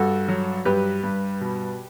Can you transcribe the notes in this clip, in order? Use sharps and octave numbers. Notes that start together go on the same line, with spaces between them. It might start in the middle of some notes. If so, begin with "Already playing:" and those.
Already playing: G2 F#4 A4
F#3
G2 G4 B4
G2
B2